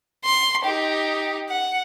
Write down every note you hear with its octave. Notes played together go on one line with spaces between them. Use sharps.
C6
D#4 G4
F#5